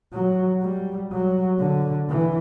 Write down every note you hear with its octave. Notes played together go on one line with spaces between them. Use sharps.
F#3
G3
F#3
D3
E3